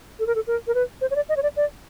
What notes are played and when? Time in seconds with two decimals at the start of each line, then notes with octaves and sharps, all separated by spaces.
0.19 A4
0.27 A#4
0.35 A4
0.47 A#4
0.67 A#4
0.75 B4
1.01 C5
1.11 C#5
1.16 D5
1.29 D#5
1.37 C#5
1.43 D5
1.57 D5